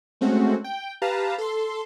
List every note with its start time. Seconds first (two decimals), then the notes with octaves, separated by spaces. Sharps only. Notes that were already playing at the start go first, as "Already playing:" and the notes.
0.21 G#3 A3 C4 C#4 F#4
0.64 G5
1.02 G4 B4 F5 A5 A#5
1.38 A4 C6